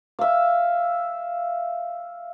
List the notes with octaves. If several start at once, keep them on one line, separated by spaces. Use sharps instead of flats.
E5 F5